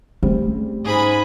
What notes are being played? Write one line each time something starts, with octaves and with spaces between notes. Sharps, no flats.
C#3 G3 A3 C4
G#2 G#4 B5